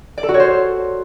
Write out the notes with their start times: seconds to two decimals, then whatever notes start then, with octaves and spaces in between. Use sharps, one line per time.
0.18 D5
0.23 A4
0.29 F#4
0.34 C#5
0.40 C5